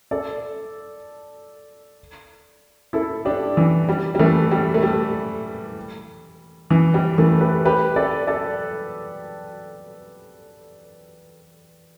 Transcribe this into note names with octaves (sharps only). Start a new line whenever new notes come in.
A4 D5
E4 A4
D4 G4
E3
G3
G3
E3 A3
G3
A3
G3
E3
G3
E3 A3
G4 B4
G4 B4
A4 D5
A4 D5